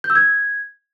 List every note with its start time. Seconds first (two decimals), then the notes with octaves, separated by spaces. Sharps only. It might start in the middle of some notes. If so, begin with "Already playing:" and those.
0.04 G6
0.10 E6
0.15 G#6